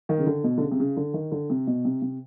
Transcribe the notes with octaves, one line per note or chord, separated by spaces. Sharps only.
D#3
C#3
D3
B2
D3
C#3
C3
C#3
D3
D#3
D3
C3
B2
C3
C3